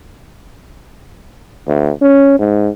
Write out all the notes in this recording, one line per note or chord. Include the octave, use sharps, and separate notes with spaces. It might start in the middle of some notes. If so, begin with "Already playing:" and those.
D2
C#4
G#2